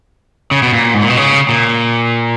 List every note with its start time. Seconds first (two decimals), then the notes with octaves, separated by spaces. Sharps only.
0.51 C#3
0.63 B2
0.73 A#2
0.94 G#2
1.02 A#2
1.10 B2
1.17 C#3
1.49 A#2